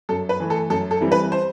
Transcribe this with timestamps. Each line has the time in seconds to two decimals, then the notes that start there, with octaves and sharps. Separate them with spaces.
0.09 F#2 A4
0.29 B4
0.40 E3 A3
0.50 A4
0.70 F#2 A4
0.91 A4
1.01 E3 G3 C4 E4
1.12 B4
1.32 C5